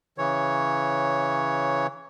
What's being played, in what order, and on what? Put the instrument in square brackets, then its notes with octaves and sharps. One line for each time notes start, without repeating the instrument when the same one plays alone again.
[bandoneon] C#3 E3 C#5